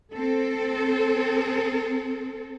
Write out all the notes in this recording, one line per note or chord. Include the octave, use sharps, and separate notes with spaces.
C4 A4